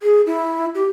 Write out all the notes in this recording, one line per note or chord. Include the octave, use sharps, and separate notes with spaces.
G#4
E4
G4